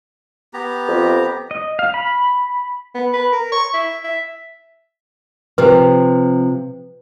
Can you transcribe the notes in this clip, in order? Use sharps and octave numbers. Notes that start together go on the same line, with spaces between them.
B3 G4 A#5
F2
D#5
F5
B5
B3
B4
A#4
C#6
E5
E5
C3 F3 B4